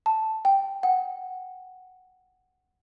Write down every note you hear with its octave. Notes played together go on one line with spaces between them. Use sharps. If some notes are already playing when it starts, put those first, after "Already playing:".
A5
G5
F#5